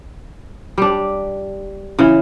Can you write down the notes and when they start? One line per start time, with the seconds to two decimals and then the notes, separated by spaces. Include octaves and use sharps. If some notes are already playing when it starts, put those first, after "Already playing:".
0.78 G3 D4
1.99 C#3 E3